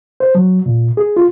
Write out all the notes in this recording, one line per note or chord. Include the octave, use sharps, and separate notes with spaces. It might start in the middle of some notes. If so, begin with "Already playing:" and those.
C5
F#3
A#2
G#4
F4